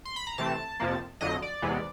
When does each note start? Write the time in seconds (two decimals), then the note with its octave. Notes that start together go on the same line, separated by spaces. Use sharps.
0.05 C6
0.16 B5
0.27 A#5
0.38 C3 E3 A3 C4 A5
0.80 F2 C3 F3 A#3
1.21 F2 D3 F#3 D#5
1.42 D5
1.62 E2 C3 E3 G#3 B3